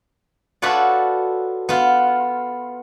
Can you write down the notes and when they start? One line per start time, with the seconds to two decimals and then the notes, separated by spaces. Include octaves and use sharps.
0.62 F4 F#4 A4 B4 C#5 D5
1.69 B3 F4